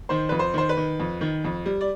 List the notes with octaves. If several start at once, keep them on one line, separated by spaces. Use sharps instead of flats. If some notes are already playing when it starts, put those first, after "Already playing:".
D#3 C5
F2 B4
C5
D#3 C5
B4
D#3
F2
D#3
F2
G3
D5